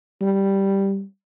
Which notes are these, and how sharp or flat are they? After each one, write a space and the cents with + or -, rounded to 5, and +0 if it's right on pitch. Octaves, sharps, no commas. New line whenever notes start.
G3 +0